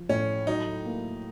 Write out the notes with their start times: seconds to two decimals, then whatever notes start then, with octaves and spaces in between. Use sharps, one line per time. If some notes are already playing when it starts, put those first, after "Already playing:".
Already playing: F3
0.09 A2 C#4
0.47 F#3 D#4
0.85 A#3